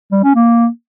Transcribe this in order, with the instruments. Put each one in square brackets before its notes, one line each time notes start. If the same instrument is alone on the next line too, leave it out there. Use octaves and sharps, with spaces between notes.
[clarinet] G3
C#4
A#3